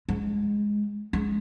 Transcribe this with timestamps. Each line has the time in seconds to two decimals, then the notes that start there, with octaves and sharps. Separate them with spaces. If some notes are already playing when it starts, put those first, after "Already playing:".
0.09 G#3
1.13 G#3